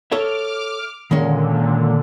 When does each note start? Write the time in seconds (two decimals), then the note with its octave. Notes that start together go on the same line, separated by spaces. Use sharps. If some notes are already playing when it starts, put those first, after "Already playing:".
0.12 A4 C#5 E5 D6 F6
1.11 A#2 D3 D#3 G#3 C#4